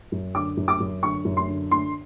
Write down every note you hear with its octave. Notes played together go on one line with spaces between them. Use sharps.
F#2
D3 D6
F#2
D6
F#2
D3 C#6
F#2
C6
D3
D3 C6